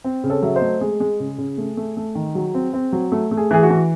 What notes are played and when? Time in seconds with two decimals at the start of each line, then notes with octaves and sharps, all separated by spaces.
0.04 C4
0.24 C#3
0.30 A4 C#5
0.42 F#3 E5
0.55 C5 D#5
0.62 A3
0.81 G#3 G#4
1.00 G#3
1.20 C#3
1.38 C#3
1.58 A3
1.77 A3
1.97 A3
2.15 D#3
2.35 F#3
2.54 C4
2.74 C4
2.93 F#3
3.12 A3
3.31 A3
3.37 G#4
3.51 E3 G#4
3.63 F#4
3.70 E3